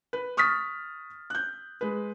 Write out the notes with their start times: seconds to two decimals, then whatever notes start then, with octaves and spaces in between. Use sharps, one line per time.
0.13 B4
0.37 C#6 D#6 F6 A6 B6
1.30 F#6 G6
1.81 G#3 B4